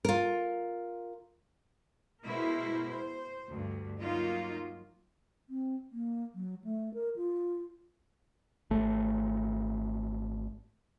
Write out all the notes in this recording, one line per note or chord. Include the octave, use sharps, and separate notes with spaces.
F4 A#4
B2 G#3 E4 A#4 C5
C5
D2 G2
F#3 A#3 D#4 F4
C4
A#3
F#3
A3
A#4
F4
G#1 A3